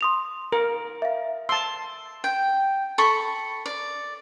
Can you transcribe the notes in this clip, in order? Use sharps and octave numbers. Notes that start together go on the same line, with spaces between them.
C6 D#6 F7
A#4
E5 F5
A5 C6 E6
G5
A4 B5 C#6
D5